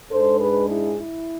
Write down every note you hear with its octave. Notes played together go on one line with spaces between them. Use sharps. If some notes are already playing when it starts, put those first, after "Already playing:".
G#2 G#3 D4 A4 C5
G#4 B4
E4 G#4
E4